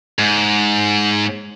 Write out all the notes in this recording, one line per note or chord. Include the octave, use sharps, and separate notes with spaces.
G#2